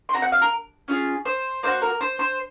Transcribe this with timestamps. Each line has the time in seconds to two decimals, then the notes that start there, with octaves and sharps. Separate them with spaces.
0.09 C6
0.13 C4 F#4 A#5
0.22 F#5
0.32 F5
0.41 A#4
0.88 C#4 F4 G#4
1.25 C5
1.63 A#3 D#4 F#4 C5
1.82 A#4
2.01 C5
2.19 C5